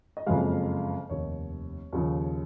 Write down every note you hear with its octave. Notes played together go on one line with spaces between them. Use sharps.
D#5
F#1 F2 C#3 G#3 F5
F1 D#2 D#3 C#5
D#2 C#3 F3